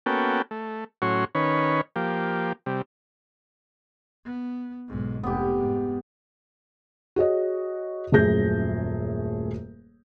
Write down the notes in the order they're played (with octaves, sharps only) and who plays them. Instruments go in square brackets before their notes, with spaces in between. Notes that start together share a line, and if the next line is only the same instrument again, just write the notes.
[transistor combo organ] A#3 B3 C#4 F#4 A4 G5
A3
A2 F#3 C#4 F#4 C#5 C6
D#3 C#4 B4 C#5
F3 A#3 G4
C3 G3
[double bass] B3
B1 G#2
[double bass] F1 [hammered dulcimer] B3 G4
[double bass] G#2
[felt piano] F#4 G#4 C#5 D#5
D#1 F#2 A3 G#4 G6 A#6